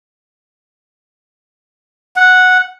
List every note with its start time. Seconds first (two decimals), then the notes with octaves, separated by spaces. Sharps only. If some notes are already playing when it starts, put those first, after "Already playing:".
2.16 F#5